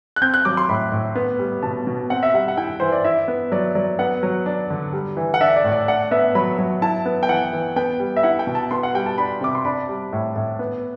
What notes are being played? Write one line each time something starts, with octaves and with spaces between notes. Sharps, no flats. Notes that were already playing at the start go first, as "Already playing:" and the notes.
F#6
C4 G6
F#6
F#3 D6
C6
A2 B5
A2
B3
G3
B2 A5
B2
C4 F#5
E5
G3 F#5
F#5
E4 G5
E3 C5
D5
E4 E5
B3
F#3 D5
F#3 D5
B3 F#5
F#3
D4
D3
G3
E3
F#5
D4 E5
D5
A2
D5
D4 F#5
B3 E5
F#3 B5
F#3
E4 A5
B3
G5
E3 F#5
E3
B3 G5
G3
E5
E4 F#5
G5
B2
A5
B3 C6
F#5
G3 G5
A5
D4 B5
C3 D6
C6
D4 B5
G3
A2
A2
B3